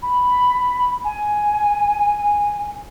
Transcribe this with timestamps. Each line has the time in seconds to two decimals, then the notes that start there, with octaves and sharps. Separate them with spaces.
0.02 B5
1.04 G#5